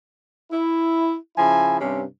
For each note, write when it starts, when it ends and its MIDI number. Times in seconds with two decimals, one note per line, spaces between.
0.51 1.15 64
1.37 1.77 49
1.37 1.77 53
1.37 1.77 64
1.37 1.77 80
1.80 2.03 43
1.80 2.03 48
1.80 2.03 60
1.80 2.03 61